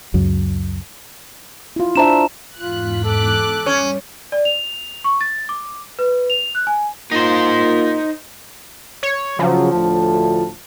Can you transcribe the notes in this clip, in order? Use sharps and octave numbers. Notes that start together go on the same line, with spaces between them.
C#2 F#2 F#3
E4 F4
D4 C5 E5 A5 A#5 E7
E2 G#2 F4 F#6 B6
A4 D6 F#6
G3 C#4
D5
F7
C#6
A6
D6
B4
F7
F#6
G#5
A#3 D#4 F4 C5
C#5
C#3 F3 F#3
D2 A2 A5